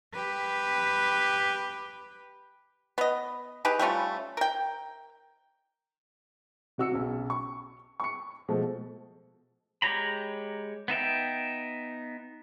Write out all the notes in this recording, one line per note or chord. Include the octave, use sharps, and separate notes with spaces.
G4 B4
B3 D#5
D#4 G4 G#4 B4
G3 A3 C#4 F4
A#4 G5
C3 F#4 E6 C#7
B1 C#3
C#6
C#6 C#7
B2 F3 G#3 A3
G#3 G4 C#5 A#5 B5
B3 D#4 E5 G5